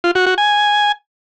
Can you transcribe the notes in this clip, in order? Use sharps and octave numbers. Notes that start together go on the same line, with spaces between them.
F4
F#4
F#4
G#5